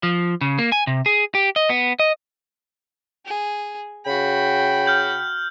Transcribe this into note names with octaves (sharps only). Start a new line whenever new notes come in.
F3
C#3
A#3
G#5
C3
G#4
G4
D#5
B3
D#5
G#4
C#3 F#4 G5 B5
F6 G6 F#7